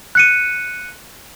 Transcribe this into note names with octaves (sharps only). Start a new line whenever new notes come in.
F#6 C#7 D#7